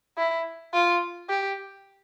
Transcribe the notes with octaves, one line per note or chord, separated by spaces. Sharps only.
E4
F4
G4